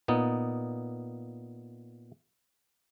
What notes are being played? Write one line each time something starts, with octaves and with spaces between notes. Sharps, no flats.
A#2 B3 D#4